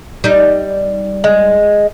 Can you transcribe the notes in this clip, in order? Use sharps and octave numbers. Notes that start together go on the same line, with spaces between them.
G3 D#4
G#3